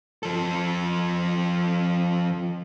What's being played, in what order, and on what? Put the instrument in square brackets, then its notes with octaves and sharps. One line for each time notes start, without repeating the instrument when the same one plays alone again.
[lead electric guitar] F3 A4